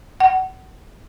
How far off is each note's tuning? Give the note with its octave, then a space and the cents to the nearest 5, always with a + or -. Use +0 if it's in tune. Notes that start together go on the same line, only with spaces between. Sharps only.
F#5 +25